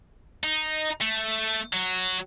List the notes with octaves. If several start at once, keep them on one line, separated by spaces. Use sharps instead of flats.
D#4
A3
F#3